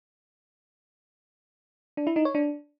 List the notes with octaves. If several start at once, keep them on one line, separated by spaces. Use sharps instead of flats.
D4
E4
D#4
C#5
D4